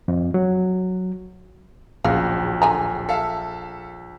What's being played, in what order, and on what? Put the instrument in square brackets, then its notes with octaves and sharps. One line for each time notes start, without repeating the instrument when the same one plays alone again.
[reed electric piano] F2
F#3
[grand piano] D1 F#4 [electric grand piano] A#1 [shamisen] C#3 F5
[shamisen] D3 G#5 A#5
[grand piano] A4 E5 F5